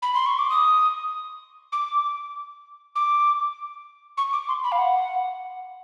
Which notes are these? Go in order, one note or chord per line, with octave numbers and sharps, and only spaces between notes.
B5
C6
C#6
D6
D#6
D6
D6
C#6
D6
C6
B5
F5
F#5